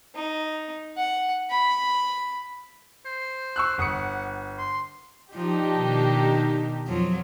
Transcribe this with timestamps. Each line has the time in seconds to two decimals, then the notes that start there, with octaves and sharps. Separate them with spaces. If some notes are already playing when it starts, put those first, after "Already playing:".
0.16 D#4
0.98 F#5
1.50 B5
3.05 C5
3.56 C#6 E6 F#6
3.78 G1 F#5 D#6 C#7
4.58 C6
5.34 F3 D4 D#4 G4
5.78 B2 D#3
6.87 F2 F3 F#3